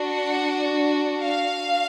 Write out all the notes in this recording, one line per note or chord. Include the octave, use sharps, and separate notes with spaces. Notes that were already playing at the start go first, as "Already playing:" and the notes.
Already playing: D4 F#4
F#5
F5